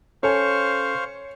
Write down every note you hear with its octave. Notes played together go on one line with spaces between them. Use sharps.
C#4 A4 C5 C#5 F5 G#5 C#6